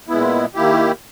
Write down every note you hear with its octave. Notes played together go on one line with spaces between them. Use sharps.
A#2 G#3 B3 E4
D#3 A#3 E4 G4